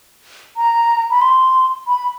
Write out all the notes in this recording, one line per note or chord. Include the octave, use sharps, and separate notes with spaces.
A#5
B5
C6
B5